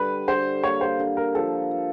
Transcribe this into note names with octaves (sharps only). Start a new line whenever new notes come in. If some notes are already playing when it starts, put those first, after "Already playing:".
Already playing: D3 G3 D4 B4
D3 C5
A#3 C#5
C5
D3
A#4
F3 A4
A#3